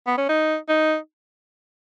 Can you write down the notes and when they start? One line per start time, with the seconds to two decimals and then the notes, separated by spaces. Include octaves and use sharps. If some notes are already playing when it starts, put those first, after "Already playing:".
0.07 B3
0.18 C#4
0.29 D#4
0.69 D#4